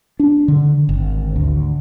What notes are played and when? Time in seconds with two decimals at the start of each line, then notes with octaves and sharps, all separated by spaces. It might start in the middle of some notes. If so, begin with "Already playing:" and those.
0.20 D4
0.48 D3
0.89 G#1
1.36 D2